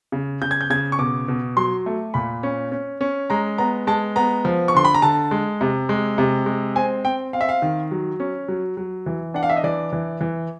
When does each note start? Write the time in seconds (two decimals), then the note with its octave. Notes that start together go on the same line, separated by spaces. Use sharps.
0.12 C#3
0.42 C#3 G6
0.51 G#6
0.61 G6
0.70 C#3 G#6
0.92 C#6
0.99 B2 D6
1.28 B2
1.57 F#3 C6
1.86 A3
2.14 A#2 B5
2.43 C#4
2.72 C#4
3.01 C#4
3.30 G#3 A#5
3.58 B3 A#5
3.87 G#3 A5
4.16 B3 A#5
4.45 F3
4.68 C#6
4.74 D3 C6
4.85 B5
4.94 A#5
5.02 D3 A5
5.31 G#3
5.61 C3
5.89 G#3
6.18 C3
6.46 G#3
6.76 C4 G#5
7.04 C4 G5
7.33 C4 F5
7.41 E5
7.49 F5
7.62 D#3
7.91 F#3
8.20 C#4
8.48 F#3
8.77 F#3
9.06 E3
9.34 D4 F#5
9.43 F5
9.50 E5
9.56 D#5
9.64 E3 D5
9.92 E3
10.21 E3